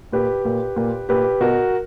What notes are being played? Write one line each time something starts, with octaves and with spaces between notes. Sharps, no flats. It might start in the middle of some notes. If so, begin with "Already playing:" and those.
A#2 G4 B4
A#2
A#2
A#2 G4 B4
B2 F#4 A#4